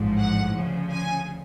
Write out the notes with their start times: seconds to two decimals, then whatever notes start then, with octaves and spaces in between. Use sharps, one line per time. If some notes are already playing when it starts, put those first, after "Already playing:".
Already playing: A1 G#2 F3
0.18 F#5
0.54 D2 C#3 F3
0.91 G#5